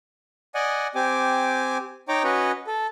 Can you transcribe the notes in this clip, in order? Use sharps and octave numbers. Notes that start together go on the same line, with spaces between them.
D5 D#5 F#5 G#5
C4 G4 G#5 D6
D#4 C#5 G5 A#5 D6
C#4 F#4 B4 C#5 D#5
A4